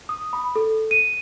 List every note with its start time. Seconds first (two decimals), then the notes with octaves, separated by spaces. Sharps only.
0.09 D#6
0.33 B5
0.56 A4
0.91 D#7